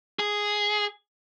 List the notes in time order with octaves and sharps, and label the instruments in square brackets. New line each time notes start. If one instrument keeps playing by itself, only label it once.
[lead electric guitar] G#4